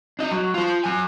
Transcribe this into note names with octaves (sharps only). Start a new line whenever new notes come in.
D4 D#5
F#3
F4 C5
F#3 G#5